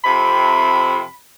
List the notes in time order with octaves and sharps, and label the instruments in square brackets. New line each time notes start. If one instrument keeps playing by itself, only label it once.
[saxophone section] F2 C3 [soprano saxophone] B5